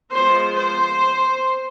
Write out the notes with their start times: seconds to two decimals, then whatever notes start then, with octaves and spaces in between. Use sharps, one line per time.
0.12 F3 G#3 B3 C5
0.56 C5